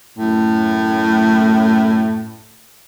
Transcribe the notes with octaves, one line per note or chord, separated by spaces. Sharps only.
F#2 A2